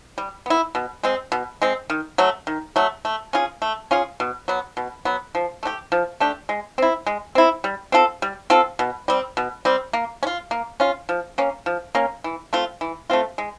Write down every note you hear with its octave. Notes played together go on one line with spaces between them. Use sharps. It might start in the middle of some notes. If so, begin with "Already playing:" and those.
G3
B3 E4
B2
G#3 C4
B2
G#3 C4
D#3
F#3 A3
D#3
F#3 A3
A3
C#4 F4 G#4
A3
C#4 F4 G#4
B2
F#3 B3
B2
F#3 B3
F3
A3 D4 G4
F3
A3 D4 G4
G#3
C4 E4
G#3
C4 E4
G3
C4 F4 A4
G3
C4 F4 A4
B2
G3 C4
B2
G3 C4
A#3
C#4
F4
A#3
C#4 F4
F3
A#3 C#4
F3
A#3 C#4
E3
A3 C4 F4
E3
A3 C4 F4
G#3